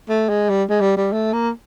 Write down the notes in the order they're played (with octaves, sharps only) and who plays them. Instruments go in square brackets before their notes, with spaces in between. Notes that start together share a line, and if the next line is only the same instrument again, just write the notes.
[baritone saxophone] A3
G#3
G3
G#3
G3
G3
A3
A#3